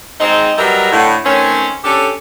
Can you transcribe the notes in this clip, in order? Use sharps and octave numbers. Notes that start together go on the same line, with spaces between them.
G#3 C4 D#4
F#3 G3 A#4 B4 D#5 E5
A2 D3
D#3 A3 C4 C#4
C#4 D4 G4 A4